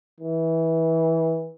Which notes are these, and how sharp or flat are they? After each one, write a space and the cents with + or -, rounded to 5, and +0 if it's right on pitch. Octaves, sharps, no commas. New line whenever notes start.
E3 -20